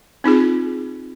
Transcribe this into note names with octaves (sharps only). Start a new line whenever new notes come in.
C4 D#4 F4 G#4